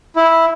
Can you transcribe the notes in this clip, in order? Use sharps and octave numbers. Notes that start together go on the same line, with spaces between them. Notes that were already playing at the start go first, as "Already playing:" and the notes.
E4